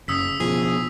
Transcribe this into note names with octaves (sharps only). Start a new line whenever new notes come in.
F#1 C#3 D#6 E6 B6
B2 F3 G#4